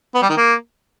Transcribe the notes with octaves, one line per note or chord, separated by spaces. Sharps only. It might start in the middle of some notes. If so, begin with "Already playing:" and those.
B3
G3
D#3
A#3